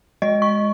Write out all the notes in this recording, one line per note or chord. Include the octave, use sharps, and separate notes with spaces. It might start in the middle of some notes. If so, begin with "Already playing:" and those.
G#3 D#5
C#6